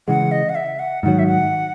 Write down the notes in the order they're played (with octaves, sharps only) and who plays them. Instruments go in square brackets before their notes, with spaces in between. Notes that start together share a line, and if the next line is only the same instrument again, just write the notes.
[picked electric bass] C#3 E3 G#3 [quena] F#5
[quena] D#5
F#5
E5
F#5
[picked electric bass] G#2 D#3 F#3 [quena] F#5
[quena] E5
F#5